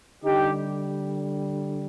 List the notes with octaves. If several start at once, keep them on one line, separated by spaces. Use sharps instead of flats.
D3 G3 D#4 G4